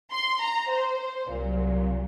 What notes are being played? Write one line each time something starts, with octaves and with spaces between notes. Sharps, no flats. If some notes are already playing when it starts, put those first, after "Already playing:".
C6
A#5
C5
C5
C2 A#2 F#3